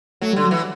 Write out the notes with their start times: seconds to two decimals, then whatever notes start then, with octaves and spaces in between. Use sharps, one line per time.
0.22 F#3 A3
0.33 D3 G3
0.44 F#3
0.51 E3